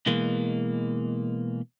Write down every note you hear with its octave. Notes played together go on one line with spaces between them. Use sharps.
B2 E3 G#3 A#3